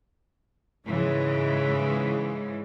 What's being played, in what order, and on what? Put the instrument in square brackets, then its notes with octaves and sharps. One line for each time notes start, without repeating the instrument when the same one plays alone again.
[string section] G#2 C#3 E3 G#3